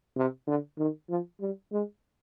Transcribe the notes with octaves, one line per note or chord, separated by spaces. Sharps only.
C3
D3
D#3
F3
G3
G#3